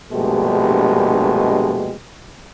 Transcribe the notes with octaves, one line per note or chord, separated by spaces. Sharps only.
A#1 G2 B2 G#3 A3 G4